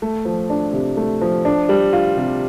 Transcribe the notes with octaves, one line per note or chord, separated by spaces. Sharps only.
A3
F3
D4
C3
A3
F3
D4
G3
F4
C3